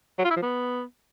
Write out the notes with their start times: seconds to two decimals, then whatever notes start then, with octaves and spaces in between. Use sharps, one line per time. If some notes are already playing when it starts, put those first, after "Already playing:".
0.19 F#3
0.24 F4
0.30 E4
0.36 F3
0.42 B3